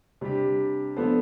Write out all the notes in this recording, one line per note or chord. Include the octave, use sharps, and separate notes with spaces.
C3 G3 D4 G4
F3 B3 D4 A4 C5